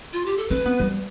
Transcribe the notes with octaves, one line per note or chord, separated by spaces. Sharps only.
F4
G4
A4
C4 B4
B3
G3